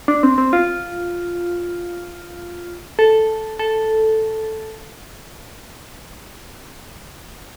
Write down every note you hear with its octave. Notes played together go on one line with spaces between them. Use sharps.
D4
C4
C4
F4
A4
A4